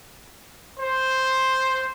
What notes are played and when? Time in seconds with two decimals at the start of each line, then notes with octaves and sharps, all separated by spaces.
0.79 C5